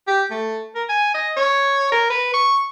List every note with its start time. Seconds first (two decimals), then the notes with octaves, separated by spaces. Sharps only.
0.08 G4
0.31 A3
0.75 A#4
0.89 G#5
1.14 D#5
1.37 C#5
1.92 A#4
2.10 B4
2.34 C#6